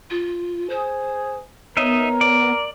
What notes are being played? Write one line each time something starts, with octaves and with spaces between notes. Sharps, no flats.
F4
G#4 C5
B3 D#4 A#4 C#5 D#5 E5
D5